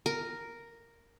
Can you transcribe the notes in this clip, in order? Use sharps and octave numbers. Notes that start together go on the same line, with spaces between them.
A#4